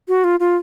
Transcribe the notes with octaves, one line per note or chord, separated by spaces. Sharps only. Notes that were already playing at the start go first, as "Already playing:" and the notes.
F#4
F4
F4